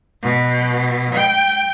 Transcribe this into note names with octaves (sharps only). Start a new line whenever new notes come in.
B2
G5